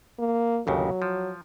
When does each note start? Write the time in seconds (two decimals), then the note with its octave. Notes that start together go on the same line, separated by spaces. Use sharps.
0.19 A#3
0.67 G1 D#2 C#3 F#3
1.02 F3